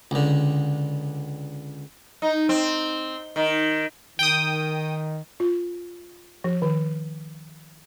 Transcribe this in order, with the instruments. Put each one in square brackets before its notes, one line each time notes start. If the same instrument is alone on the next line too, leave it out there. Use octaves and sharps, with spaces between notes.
[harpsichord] C#2 D3
[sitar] D#4
C4
D#3
[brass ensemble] D#3 [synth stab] G5 D#6
[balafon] F4
F3
D#3